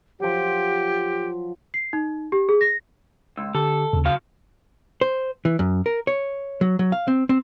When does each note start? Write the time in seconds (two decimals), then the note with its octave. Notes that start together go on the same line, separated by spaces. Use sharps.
0.20 F3 F#3 G4
1.74 C7
1.93 D#4
2.32 G4
2.49 G#4
2.61 A#6
3.37 C#2 E6
3.55 D3 G4 A4
3.93 D#2 C#3
4.05 F#3 F5
5.01 C5
5.45 E3
5.59 F#2
5.86 A#4
6.07 C#5
6.61 F#3
6.79 F#3
6.92 F5
7.08 C4
7.29 C4